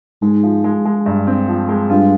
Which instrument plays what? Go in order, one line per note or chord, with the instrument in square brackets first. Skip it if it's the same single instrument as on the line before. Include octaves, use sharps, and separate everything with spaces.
[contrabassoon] G#2 [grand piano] G#3
[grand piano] F3
G#3
G#3
G2
C4
F3
G#3
[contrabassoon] G2 [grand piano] F4